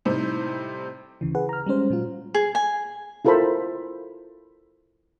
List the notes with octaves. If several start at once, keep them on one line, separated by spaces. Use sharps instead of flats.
A2 C3 G3 D#4 C5
D2 C#3 E3
G#4 B4 F#5
A#5 F6
G3 G#3 C#4 C5
A#2 F#3 F4
G#4
G#5
E4 F4 A4 A#4 C5 B5